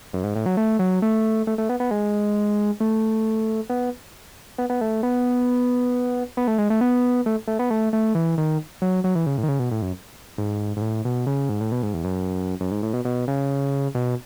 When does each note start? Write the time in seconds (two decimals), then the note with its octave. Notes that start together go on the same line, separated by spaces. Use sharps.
0.13 F#2
0.24 G#2
0.35 A2
0.46 F#3
0.57 A3
0.79 F#3
1.02 A3
1.47 A3
1.58 A3
1.69 B3
1.80 B3
1.91 G#3
2.80 A3
3.70 B3
4.58 B3
4.70 B3
4.81 A3
5.03 B3
6.37 B3
6.47 A3
6.58 G#3
6.70 A3
6.81 B3
7.26 A3
7.47 A3
7.59 B3
7.70 A3
7.93 A3
8.15 E3
8.38 D#3
8.82 F#3
9.04 F#3
9.15 E3
9.26 C#3
9.38 A2
9.43 D#3
9.48 C#3
9.59 B2
9.71 A2
9.82 F#2
10.38 G#2
10.77 G#2
10.82 A2
11.05 B2
11.26 C#3
11.49 G#2
11.61 A2
11.72 B2
11.83 G#2
11.94 E2
12.04 F#2
12.60 F#2
12.71 G#2
12.83 A2
12.93 B2
13.05 B2
13.28 C#3
13.95 B2